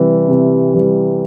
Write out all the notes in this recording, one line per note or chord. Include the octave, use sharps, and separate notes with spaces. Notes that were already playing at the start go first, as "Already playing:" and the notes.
Already playing: C3 E3 G3
C3
E3 G3